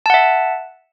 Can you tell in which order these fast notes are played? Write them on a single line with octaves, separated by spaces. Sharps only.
A5 F#5 E5